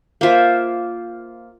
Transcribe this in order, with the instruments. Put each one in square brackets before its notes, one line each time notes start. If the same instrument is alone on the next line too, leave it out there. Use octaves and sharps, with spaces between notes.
[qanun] A#3 F4 C5 E5